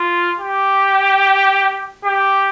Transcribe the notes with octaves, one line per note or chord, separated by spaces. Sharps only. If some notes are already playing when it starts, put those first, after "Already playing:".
Already playing: F4
G4
G4